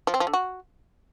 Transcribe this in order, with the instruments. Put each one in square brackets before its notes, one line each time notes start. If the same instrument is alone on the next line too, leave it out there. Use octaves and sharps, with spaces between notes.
[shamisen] F3
C4
F3
D3
F#4